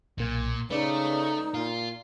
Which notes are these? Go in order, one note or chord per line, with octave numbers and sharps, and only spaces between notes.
B1 A#2 A#3 G#6
C#3 A3 D#4 B4 D5
A#2 F4